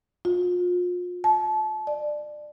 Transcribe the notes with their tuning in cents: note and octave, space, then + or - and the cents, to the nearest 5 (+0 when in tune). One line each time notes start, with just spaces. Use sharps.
F4 +35
A5 -30
D5 +25